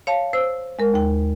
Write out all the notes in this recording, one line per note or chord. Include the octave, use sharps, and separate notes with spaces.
C#5 F5 A5
C5 E6
G#3 A#4
D#2 G5